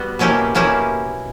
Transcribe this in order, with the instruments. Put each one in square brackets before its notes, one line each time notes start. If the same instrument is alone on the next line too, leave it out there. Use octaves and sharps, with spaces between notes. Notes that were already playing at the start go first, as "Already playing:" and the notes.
Already playing: [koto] G3 B3 F#4
B2 A#3 C#4 E4 G4
B2 A#3 C#4 E4 G4